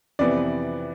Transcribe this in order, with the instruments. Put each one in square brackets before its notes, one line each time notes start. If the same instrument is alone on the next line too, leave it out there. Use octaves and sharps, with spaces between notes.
[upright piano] F2 C3 E3 B3 D5